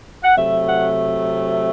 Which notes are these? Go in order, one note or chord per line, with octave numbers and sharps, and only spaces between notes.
F#5
C3 F#3 A3 E5
F#5